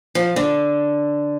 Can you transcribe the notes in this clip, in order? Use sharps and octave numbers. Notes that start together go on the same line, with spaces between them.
F3
D3